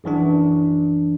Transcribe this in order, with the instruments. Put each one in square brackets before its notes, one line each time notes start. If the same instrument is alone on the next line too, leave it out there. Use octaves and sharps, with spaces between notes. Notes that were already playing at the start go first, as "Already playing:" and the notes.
[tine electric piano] A#1 F#2 E3 D4